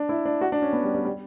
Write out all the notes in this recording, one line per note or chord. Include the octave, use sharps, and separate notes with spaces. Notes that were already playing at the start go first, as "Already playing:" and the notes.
Already playing: D4
E4
D4
F#4
D4
C#4
B3
G3
G3
G3